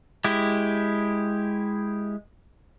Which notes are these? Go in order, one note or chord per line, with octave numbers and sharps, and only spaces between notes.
G#3 E4 G4